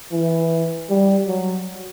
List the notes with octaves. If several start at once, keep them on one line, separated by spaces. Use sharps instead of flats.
E3
G3
F#3